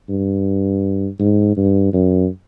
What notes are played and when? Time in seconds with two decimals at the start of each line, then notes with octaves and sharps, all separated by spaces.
0.09 G2
1.19 G#2
1.57 G2
1.93 F#2